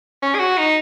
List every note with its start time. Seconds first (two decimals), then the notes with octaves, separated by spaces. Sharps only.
0.23 C#4
0.35 G#4
0.40 F#4
0.58 D#4